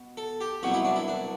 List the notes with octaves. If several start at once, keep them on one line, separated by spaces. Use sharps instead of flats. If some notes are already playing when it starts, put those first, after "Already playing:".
Already playing: B2
A4
G4
C2 B2 F#3 F#4
E4
D4
E4
D4